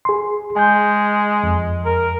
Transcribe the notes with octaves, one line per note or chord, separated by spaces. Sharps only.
G#4 C6
G#3 G#5 G6
F2
A#4